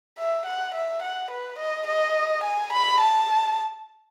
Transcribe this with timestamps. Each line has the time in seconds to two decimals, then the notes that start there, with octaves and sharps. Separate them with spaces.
0.18 E5
0.45 F#5
0.74 E5
1.02 F#5
1.31 B4
1.59 D#5
1.87 D#5
2.44 G#5
2.73 B5
3.00 A5